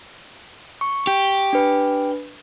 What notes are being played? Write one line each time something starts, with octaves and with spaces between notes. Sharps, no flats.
C#6
G4
D4 B4